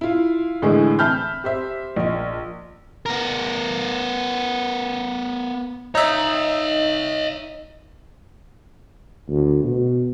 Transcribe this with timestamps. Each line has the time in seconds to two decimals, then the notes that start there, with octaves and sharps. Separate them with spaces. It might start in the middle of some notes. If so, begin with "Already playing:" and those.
0.01 E4 F4
0.62 A2 D3 E3 G#3 E4 G#4
0.99 E5 A5 B5 F6 G6
1.44 G4 C5 E5
1.96 A#1 D#5
3.06 B3 A#4
5.95 D#4 C#5 D#5 E5
9.28 D2
9.64 B2